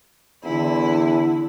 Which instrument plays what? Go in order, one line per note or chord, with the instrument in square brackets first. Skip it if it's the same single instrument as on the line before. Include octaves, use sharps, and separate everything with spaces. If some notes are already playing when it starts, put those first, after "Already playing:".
[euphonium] E2 [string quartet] D3 E4